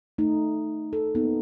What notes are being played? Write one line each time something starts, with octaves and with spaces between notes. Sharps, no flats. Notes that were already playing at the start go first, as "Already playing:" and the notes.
A3 D#4
A4
A#3 B3 D#4